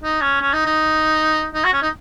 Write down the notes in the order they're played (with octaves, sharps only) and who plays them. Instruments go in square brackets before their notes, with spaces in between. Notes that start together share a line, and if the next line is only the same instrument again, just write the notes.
[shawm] D#4
C#4
C#4
D#4
D#4
D#4
F#4
C#4
D#4